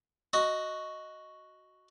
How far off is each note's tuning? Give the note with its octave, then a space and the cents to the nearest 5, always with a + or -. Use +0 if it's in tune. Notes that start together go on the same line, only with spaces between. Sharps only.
F#4 +0 D#5 +5